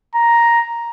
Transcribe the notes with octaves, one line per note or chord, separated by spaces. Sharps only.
A#5